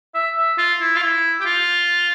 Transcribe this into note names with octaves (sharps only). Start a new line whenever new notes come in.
E5
E5
F4
E4
F4
E4
G4
F4